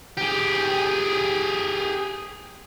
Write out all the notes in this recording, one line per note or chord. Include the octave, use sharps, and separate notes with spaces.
G4 G#4